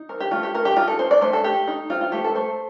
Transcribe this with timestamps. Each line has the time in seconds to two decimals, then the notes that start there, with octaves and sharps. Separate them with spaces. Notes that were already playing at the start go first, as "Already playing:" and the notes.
Already playing: D#4
0.09 C4 A#4
0.20 G4
0.31 A3 F4
0.43 G4
0.54 A3 A#4
0.65 G4
0.77 D#4 F4
0.88 A4
0.99 C4 C5
1.11 D5
1.22 A3 C5
1.33 A4
1.44 A3 G4
1.67 D#4
1.90 C4 F4
2.01 F4
2.12 A3 G4
2.24 A4
2.35 A3 C5